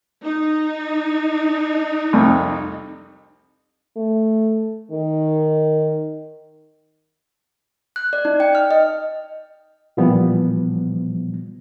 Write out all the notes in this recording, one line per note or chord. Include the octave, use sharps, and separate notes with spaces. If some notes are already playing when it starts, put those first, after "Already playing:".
D#4
C2 F2
A3
D#3
F#6
D5
D#4
G5
F6
D#5
A#2 E3 F3 G3 B3